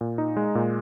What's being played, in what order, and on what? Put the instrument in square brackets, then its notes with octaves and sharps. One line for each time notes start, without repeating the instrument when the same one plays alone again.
[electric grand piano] A#2
D#4
G#3
A#2